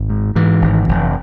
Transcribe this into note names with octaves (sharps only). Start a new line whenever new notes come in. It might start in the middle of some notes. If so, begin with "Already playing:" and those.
Already playing: G#1
G#2
G#2 E3
G#1
F1